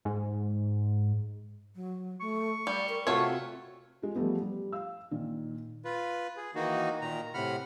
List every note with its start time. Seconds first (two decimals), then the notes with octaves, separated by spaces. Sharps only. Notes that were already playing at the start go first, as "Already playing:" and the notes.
0.05 G#2
1.75 F#3
2.21 A3 C#6
2.67 G3 D5
2.89 A#4
3.07 C3 A3 C4 F4 F#4 C#5
4.02 G#3 F4
4.15 F3 G3 A3 B3
4.42 G3
4.72 F5 E6
5.11 A#2 D#3
5.85 F4 B4
6.37 G#4
6.55 D#3 E3 A#3 D#4 F#4
7.01 A#2 D#3 A#5
7.34 A2 C3 F#5 B5 F6